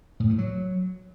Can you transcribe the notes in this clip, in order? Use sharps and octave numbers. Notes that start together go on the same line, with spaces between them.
A2
G2
F#3